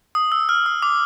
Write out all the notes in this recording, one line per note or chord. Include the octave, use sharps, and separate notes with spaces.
D#6
E6
F6
D#6
D6